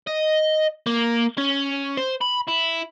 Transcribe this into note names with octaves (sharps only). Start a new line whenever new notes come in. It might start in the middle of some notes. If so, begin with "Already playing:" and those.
D#5
A#3
C#4
C5
B5
E4